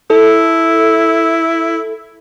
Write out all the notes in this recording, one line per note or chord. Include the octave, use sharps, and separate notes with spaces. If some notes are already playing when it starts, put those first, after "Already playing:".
E4 A4